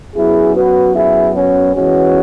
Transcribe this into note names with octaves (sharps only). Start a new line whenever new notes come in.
F#2 F#3 B3 E4 G#4
F#4 B4
E4 G#4
C#4 F#4
E2 E3 G#3 B3 C#4 F#4